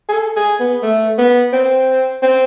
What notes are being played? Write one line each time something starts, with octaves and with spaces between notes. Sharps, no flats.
G#4
A4
G#4
B3
A3
B3
C4
C4